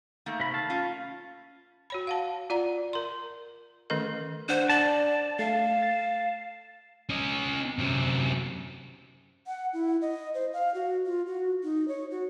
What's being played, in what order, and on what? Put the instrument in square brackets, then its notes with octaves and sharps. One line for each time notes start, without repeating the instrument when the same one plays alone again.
[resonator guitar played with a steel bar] D#3 A3 A#3
[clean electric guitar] C3 B5
F5 A5
[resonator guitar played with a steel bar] C#4 F4
[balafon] F#4 C#5 B5
F5 F#5 A5
F4 D5 F#5 A#5
A#4 C6
D#3 A3 C#4 A4 A#4 D#5
[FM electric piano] D4 F#5 [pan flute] C5
[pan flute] D5 [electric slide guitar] A5
[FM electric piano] A3 [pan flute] F5
[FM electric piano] A6
[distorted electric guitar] C#4 D#5
F#2 C3
[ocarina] F#5
E4
D#5
C5
F5
F#4
F4
F#4
D#4
C#5
F#4